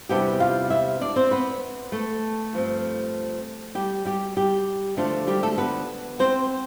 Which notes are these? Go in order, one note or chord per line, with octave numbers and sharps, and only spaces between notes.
E2 C3 G3 B3 D4 G4 G5
F4 F5
E4 E5
D4 D5
C4 C5
B3 B4
A3 A4
G2 F3 C4
G3 G4
G3 G4
G3 G4
D3 F3 A3 D4 F4
G3 G4
A3 A4
B3 B4
C4 C5